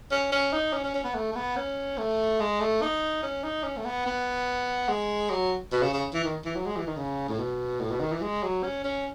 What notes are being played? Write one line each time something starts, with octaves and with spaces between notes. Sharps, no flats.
C#4
C#4
D#4
C#4
C#4
C#4
B3
A3
A3
B3
C#4
A3
G#3
A3
D#4
C#4
D#4
C#4
A3
B3
B3
G#3
F#3
B2
C#3
C#3
E3
D#3
E3
F#3
G#3
E3
D#3
C#3
A2
B2
A2
B2
D#3
E3
G#3
F#3
C#4
C#4